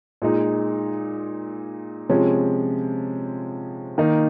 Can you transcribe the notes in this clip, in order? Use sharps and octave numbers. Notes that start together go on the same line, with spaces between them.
A#2 G#3 D#4
C3 F3 G#3 C#4
D#3 A#3 D#4